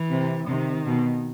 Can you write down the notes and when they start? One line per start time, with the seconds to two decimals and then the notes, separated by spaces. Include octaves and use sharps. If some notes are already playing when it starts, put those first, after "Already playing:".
Already playing: E3
0.10 C3
0.48 C3 D#3
0.85 B2